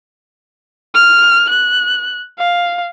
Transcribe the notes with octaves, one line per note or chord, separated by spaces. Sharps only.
F6
F#6
F5